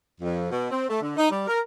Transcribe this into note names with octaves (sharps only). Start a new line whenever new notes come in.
F2
B2
C4
A3
D3
D#4
G3
A#4